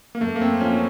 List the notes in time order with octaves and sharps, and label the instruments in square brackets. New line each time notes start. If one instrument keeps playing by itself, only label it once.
[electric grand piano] A#3
[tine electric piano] F#2 [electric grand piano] A3
[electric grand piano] A#3
C4
[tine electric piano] F3 A#3 [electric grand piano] C#4